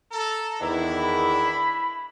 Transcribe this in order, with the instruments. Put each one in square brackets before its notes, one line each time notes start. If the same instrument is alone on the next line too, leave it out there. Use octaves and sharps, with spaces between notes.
[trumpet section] A4 [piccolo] A#5
[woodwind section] E2 D#3 [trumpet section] D4 E4
[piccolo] B5